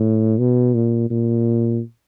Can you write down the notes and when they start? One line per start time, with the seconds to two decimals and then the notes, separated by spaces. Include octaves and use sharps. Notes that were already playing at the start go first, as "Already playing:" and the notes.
Already playing: A2
0.38 B2
0.74 A#2
1.10 A#2